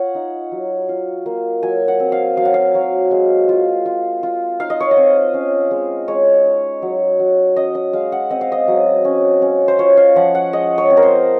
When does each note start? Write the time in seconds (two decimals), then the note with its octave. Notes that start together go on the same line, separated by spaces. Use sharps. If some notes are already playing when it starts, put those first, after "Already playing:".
Already playing: F4 C#5 F#5
0.15 D#4
0.52 F#3
0.89 F4
1.26 A#3
1.63 F#3 G#5
1.88 F#5
2.00 C4
2.12 F5
2.37 F#3 F5
2.45 F#5
2.54 F5
2.75 F#3
3.11 G#3
3.49 F4
3.86 F4
4.23 F4
4.60 D#4 F5
4.70 D#5
4.80 C#5
4.91 D#5
4.97 C4
5.34 C#4
5.71 G#3
6.08 G#3 C#5
6.45 D#4
6.82 F#3
7.19 F#3
7.56 C#4 D#5
7.75 D#5
7.93 G#3 F5
8.12 F#5
8.30 C4 D#5
8.41 F5
8.52 D#5
8.68 F#3
9.05 C#4
9.42 C#4
9.68 C5
9.79 F4 C#5
9.97 F5
10.16 F3 F#5
10.35 F#5
10.53 G#3 D#5
10.78 C#5
10.90 C4
10.97 A#4
11.03 C5